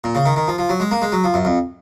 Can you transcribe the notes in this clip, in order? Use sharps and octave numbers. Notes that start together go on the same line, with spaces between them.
A#2
C#3
D#3
D#3
F3
F3
F#3
G#3
A#3
G#3
F#3
F3
F#2
F2